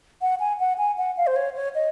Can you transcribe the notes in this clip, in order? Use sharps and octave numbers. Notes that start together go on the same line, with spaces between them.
F#5
G#5
F#5
G#5
F#5
F5
C5
C#5
C#5
D#5